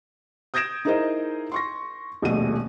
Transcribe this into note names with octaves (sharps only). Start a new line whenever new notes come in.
D#6 G6 G#6 A#6 D7 E7
D#4 E4 G#4 A#4 C5 D#5
C6 C#6 A#6
D#1 A#1 B2 A3 D#7